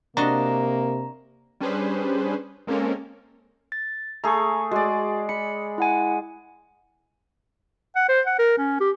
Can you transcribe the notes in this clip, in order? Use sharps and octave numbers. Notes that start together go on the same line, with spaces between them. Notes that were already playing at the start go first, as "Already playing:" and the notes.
C3 A#3 D4 F#4 D#5 A#5
G3 C#4 D4 G#4 B4 C5
G#3 A#3 C4 C#4 A4 A#4
A6
A3 G#4 A#5 C#6
G#3 F#4 D5
B5 C#7
E4 F#5 G#5
F#5
C5
F#5
A#4
C#4
G4